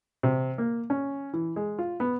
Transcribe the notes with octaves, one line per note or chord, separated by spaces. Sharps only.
C3
A#3
C#4
E3
G#3
F4
B3